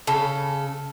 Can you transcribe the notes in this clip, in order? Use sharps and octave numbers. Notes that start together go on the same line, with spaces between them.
C#3 A4